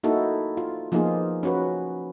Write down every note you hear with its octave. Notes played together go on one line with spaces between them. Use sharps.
A#3 D#4 E4 F#4 A4
F4
F3 A#3 B3 D#4 F4 G#4
C#4 F#4 B4